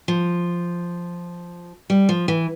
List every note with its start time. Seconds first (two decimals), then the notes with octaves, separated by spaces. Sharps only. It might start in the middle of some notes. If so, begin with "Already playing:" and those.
0.08 F3
1.90 G3
2.09 F3
2.28 E3